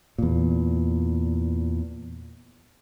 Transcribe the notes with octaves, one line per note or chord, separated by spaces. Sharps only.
E2 A#2